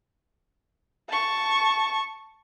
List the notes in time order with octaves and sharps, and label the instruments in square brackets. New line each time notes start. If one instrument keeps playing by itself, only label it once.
[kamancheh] A5 C#6